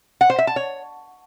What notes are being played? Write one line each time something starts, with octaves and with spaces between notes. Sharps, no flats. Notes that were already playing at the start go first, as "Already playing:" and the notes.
F#5
C5
E5
A5
C#5